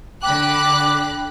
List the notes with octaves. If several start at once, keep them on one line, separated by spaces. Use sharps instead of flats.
D3 G5 B5 D6 F#6